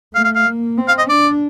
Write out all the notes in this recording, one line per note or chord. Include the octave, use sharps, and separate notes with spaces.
A3 F5
F5
F5
A#3
C4
F5
D#5
D4 D5